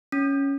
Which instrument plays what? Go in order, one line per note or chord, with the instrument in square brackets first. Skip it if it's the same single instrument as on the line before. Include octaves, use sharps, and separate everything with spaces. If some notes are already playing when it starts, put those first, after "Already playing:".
[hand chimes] C#4